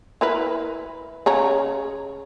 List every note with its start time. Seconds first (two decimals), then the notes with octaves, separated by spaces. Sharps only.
0.21 E4 A#4 B4
1.26 C#3 C#5 A#5